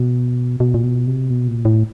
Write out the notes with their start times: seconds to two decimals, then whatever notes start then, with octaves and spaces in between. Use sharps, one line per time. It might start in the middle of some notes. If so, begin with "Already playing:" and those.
Already playing: B2
0.60 B2
0.74 A#2
0.84 B2
1.07 C3
1.30 B2
1.48 A#2
1.65 A2